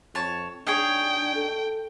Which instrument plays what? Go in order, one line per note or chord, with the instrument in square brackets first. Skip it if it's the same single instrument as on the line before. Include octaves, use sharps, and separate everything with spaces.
[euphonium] F2 [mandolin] C#5 A5
[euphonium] D4 [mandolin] D#4 G#4 C#5 [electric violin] G5
[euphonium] A4